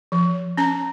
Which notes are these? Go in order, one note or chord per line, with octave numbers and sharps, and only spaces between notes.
F3
C#4 A#5